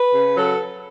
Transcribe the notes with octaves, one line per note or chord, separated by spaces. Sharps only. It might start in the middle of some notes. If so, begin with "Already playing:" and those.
Already playing: B4
C#3
F#3 A4